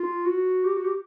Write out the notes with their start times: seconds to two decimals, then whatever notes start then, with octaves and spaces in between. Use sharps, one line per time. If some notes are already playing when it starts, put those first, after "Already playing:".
Already playing: F4
0.26 F#4
0.65 G4
0.75 F#4
0.85 G4